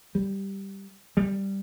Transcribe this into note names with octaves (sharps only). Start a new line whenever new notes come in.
G3
G3